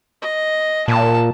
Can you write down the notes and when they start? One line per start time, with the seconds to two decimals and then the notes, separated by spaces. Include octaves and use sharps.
0.22 D#5
0.88 A#2 A5